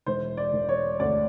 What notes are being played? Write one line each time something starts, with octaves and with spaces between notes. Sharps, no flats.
E1 C5
D5
E1
C#5
D2 D5